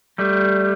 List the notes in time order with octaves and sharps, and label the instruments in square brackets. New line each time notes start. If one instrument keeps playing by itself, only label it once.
[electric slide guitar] G3 A3